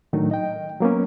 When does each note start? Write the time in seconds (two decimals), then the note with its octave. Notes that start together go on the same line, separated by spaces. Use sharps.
0.13 A2 D#3 F#3 A3 D4 D#4
0.31 D#5 G5
0.81 F#3 A#3 B3 C#4